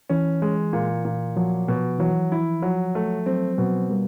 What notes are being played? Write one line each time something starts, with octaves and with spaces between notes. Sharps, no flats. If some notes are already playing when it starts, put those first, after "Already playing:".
E3 C#4
G#3
A#2
A#2
F3 F#3
B2
E3 F#3
E4
F3 F#3
A3
F#3 C4
B2 F#3
G3 A#3